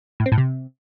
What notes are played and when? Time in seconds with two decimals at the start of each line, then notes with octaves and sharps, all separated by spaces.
0.20 A2
0.26 C4
0.32 A2
0.38 C3